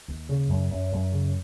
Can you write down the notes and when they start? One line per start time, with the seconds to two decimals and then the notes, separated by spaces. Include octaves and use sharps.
0.08 D#2
0.29 C#3
0.49 F#2
0.70 F#2
0.92 F#2
1.12 C#3